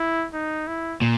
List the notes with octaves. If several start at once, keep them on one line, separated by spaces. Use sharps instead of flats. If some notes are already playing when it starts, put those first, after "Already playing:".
Already playing: E4
D#4
E4
A#2